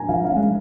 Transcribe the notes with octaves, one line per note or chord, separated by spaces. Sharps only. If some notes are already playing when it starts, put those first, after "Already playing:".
Already playing: G#5 A#5
F3 F5
F5
G#3 C#4